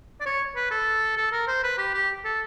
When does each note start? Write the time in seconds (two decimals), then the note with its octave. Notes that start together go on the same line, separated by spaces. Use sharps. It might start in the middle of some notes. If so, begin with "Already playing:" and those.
0.21 D5
0.26 C#5
0.56 B4
0.71 A4
1.17 A4
1.32 A#4
1.47 C5
1.64 B4
1.78 G4
1.94 G4
2.25 A4